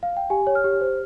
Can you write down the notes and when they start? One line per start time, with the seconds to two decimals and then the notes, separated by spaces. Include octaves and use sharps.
0.03 F5
0.17 G5
0.30 G4 G#5
0.47 C#5
0.55 F6
0.64 G4
0.81 C5